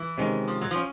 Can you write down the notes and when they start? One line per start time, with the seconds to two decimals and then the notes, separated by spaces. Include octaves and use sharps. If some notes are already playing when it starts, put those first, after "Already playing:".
Already playing: E3
0.18 C3 D#3 G#3 C#4
0.48 F3
0.61 F#3
0.71 F3
0.76 C#4